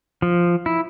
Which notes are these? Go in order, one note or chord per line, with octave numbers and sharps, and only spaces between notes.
F3
E4